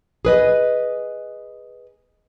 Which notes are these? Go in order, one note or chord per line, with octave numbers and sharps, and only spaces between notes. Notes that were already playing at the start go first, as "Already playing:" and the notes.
G#4 B4 D#5